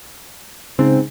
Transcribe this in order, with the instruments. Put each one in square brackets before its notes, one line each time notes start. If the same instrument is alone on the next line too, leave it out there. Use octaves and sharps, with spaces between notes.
[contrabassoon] G#2 [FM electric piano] C#3 [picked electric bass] C4